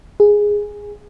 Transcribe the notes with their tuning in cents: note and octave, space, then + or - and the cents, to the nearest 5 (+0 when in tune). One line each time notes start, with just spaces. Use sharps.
G#4 -5